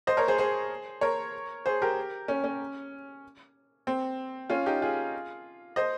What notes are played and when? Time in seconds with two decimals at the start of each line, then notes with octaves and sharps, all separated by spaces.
0.07 C5 D#5
0.17 A#4 C#5
0.28 G#4 C5
0.38 G#4 C5
1.01 A#4 C#5
1.66 G#4 C5
1.82 G4 A#4
2.28 C#4
2.44 C#4
3.87 C4
4.50 C#4 F4
4.66 D#4 G4
4.82 F4 G#4
5.76 C5 D#5